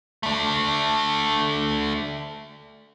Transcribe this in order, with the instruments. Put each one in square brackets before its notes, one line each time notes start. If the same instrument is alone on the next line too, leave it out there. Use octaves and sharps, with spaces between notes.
[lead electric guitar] A3 D4